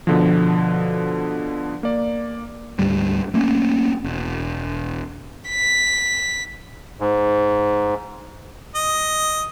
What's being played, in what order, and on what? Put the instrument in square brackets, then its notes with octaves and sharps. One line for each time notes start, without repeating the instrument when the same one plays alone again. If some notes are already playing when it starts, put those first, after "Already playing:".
[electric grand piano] B2 D3 F3
A#3 D5
[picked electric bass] D2 G#2 G3
A3 A#3 C4 C#4
E1
[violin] B6
[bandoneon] G#2
[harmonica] D#5